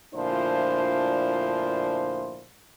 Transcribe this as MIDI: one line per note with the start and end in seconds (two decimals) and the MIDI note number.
0.15 2.45 38
0.15 2.45 46
0.15 2.45 53
0.15 2.45 62
0.15 2.45 64
0.15 2.45 72